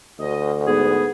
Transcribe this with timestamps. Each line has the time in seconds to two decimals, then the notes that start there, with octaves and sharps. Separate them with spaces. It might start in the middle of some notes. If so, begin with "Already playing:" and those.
0.19 D2 D#5
0.67 G#2 B3 G#4